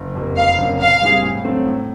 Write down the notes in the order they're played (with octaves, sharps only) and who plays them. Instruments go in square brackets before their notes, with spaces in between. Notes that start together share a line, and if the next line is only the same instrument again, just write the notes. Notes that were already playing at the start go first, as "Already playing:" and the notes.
Already playing: [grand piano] F#1
F2 C3 F3 A#3
[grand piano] F1 [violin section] F5
[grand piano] F2 C#3 F#3 A#3
[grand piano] A#2 [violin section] F5
[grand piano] G3 C4 E4 G#4
A2
F#3 A3 C4 F4
A2